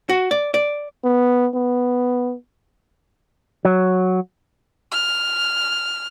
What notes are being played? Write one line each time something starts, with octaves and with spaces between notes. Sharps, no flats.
F#4
D5
D5
B3
B3
F#3
F6